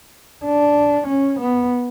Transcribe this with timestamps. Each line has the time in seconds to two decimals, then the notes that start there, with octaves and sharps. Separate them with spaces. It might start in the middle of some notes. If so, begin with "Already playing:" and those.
0.46 D4
1.08 C#4
1.40 B3